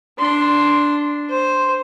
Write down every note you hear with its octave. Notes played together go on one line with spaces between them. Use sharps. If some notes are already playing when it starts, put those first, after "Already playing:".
D4 C6
C5